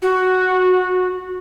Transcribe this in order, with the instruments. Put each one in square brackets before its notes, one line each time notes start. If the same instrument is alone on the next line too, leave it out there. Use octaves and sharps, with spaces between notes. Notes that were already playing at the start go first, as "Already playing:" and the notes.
[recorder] F#4